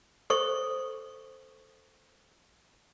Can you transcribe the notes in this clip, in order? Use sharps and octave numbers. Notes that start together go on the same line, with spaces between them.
A4 C5 C#6